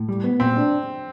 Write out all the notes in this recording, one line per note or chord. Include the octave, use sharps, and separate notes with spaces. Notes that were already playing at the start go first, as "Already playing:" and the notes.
Already playing: A2
G3
B3
A#2 C4
D4